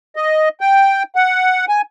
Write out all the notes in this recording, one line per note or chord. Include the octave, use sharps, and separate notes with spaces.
D#5
G5
F#5
G#5